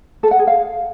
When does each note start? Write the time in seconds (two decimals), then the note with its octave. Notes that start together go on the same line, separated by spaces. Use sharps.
0.23 A4
0.31 F#5
0.39 G#4
0.47 F5